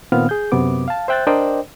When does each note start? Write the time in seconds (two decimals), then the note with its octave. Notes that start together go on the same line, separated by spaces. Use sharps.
0.12 A#2 D#3 B3 C4 F5 F6
0.29 G#4 G6
0.52 F#2 C3 B3 D6
0.88 F5 A5
1.08 C5 E5 G5 F#6 G6 A6
1.27 D4 A#4 C5 D5 D#5 G5